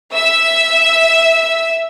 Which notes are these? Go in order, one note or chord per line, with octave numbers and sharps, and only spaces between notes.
E5 E6